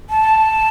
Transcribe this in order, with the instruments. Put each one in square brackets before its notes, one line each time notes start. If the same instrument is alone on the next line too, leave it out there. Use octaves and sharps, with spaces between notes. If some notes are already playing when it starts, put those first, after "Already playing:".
[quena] A5